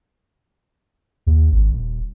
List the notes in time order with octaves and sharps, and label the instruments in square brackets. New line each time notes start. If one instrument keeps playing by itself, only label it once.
[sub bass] D#2
G#1
D#1